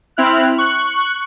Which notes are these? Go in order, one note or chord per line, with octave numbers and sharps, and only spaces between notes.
C4 E4 F6 F#6
C#6 F#6